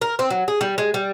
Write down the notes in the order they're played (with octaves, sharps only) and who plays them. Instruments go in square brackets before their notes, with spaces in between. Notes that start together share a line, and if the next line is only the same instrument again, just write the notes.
[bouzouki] A#4
C4
F#3
G#4
G3
G#3
G3